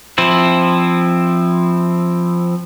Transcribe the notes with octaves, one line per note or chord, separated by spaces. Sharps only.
F3 C4 E4